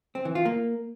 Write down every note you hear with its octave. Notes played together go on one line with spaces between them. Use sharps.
C4
E3
F4
A#3